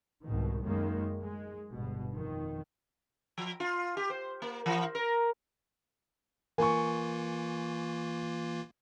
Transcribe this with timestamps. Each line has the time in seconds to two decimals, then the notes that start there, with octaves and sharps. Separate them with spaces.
0.25 C2 G#2 B2 D#3
0.62 F#2 D#3 G#3 A#3
1.21 G#3
1.72 G1 B2
2.14 F2 D#3
3.38 F3
3.60 F4
3.97 G4
4.10 C5
4.42 A#3
4.66 E3
4.95 A#4
6.58 E3 A#3 F4 A#4 G#5 C#6